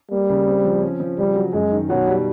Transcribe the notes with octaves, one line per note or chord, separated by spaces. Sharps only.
G3 A#3
C#3
C4
F3
C#4
F3
C#3 G3
F#3
F#2 G#3
D#3
B2 F#3
G3